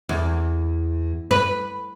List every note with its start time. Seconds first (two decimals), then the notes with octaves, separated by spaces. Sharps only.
0.09 E2
1.31 B4